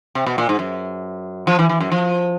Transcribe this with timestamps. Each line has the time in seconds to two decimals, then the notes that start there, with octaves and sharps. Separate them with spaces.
0.15 C3
0.26 B2
0.38 A#2
0.49 G#2
0.59 F#2
1.47 F3
1.59 E3
1.69 E3
1.80 F#2
1.92 F3